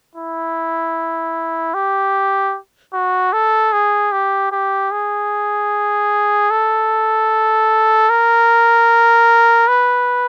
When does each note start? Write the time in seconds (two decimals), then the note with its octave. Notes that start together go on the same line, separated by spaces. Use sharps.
0.15 E4
1.74 G4
2.93 F#4
3.33 A4
3.73 G#4
4.12 G4
4.52 G4
4.92 G#4
6.51 A4
8.10 A#4
9.68 B4